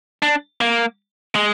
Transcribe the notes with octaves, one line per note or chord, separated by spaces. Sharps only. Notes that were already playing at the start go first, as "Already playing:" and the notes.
D4
A#3
G#3